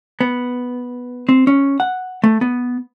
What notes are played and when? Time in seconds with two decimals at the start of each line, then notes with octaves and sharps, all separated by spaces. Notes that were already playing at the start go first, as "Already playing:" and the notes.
0.21 B3
1.29 C4
1.47 C#4
1.80 F#5
2.24 A3
2.41 B3